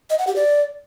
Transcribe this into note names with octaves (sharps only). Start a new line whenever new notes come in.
D#5
F#5
G4
D5